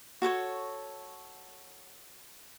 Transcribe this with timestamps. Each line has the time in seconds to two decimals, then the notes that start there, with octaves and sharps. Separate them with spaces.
0.22 F#4 A4 C5 C#5